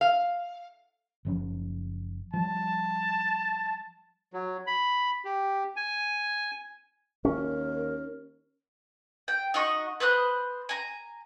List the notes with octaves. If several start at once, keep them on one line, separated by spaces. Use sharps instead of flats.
F5
F#1 F3 C#4
F3 G3 A5
F#3
B5
G4
G#5
D#2 C#4 A#4
G5
D#4 F#4 D#5 C#6
B4 C5 D#6 F#6
G#5 A#5